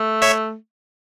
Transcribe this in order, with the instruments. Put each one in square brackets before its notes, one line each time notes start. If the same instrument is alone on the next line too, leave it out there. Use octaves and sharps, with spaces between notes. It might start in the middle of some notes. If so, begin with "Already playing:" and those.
Already playing: [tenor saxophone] A3
[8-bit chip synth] C#5 E5